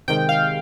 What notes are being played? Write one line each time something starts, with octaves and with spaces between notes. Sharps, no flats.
C3 D#3 G#3 G5
F5